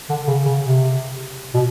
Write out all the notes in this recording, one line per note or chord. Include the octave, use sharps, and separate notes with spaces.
D3
C#3
C#3
C3
B2